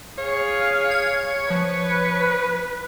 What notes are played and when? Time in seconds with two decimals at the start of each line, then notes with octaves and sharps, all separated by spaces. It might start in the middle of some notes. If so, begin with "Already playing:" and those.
0.18 G#4 C#5 F5
0.91 G#6
1.50 F3 B4